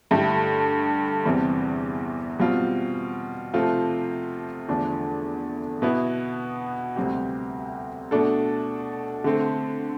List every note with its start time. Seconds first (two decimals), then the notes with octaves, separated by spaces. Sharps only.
0.11 G2 D3 A3 E4 G4
1.25 E2 C3 E3 G3 C4
2.39 B2 G3 C4 F4
3.54 C3 F3 A3 C4 F4
4.68 E2 D3 F3 A3 D4
5.82 B2 B3 E4
6.96 D2 C3 G3 C4 G4
8.11 B2 A3 D4 A4
9.24 D3 A3 C4